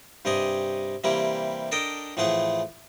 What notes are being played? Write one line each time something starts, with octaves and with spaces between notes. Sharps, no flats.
G2 C3 G4 D#5 G#5
C3 E3 G3 A#3 E4 G4
D4 A4 A#4 D#5 G5
A2 E3 F3 A3 G#4 F#5